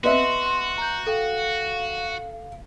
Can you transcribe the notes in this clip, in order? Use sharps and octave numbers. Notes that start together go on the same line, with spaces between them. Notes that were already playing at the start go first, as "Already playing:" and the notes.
B3 F#4 D#5 E5 C6
A#5 G6
A4 F5 G5